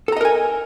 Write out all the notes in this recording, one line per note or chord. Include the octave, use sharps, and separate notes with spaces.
A4 A#4 D#5 G#5 A#5